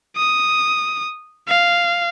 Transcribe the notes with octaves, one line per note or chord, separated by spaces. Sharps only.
D#6
F5